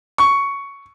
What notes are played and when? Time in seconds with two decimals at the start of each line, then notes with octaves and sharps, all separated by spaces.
0.18 C#6